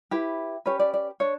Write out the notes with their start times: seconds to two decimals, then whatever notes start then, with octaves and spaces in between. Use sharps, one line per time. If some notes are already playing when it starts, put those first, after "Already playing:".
0.11 E4 G4 B4
0.66 C#4 G4 B4 C#5
0.79 D5
0.94 D5
1.20 D4 C#5